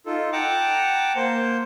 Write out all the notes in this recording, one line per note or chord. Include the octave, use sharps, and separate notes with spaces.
D#4 F4 A4
F#5 G5 A5 A#5 D6
A#3 C5